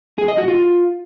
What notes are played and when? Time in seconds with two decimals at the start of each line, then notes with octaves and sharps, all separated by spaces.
0.18 G#4
0.28 D#5
0.38 F#4
0.48 F4